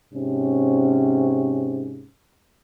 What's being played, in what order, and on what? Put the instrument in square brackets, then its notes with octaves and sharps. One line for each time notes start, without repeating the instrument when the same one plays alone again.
[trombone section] G#2 C3 C#4